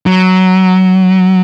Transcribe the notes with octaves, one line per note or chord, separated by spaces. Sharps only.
F#3